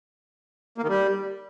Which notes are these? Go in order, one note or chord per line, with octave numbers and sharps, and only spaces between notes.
A#3
D#3
G3